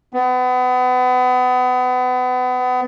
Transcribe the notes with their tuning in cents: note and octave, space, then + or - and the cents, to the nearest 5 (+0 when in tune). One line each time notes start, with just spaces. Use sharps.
B3 +30